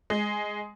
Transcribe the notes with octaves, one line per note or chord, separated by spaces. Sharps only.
G#3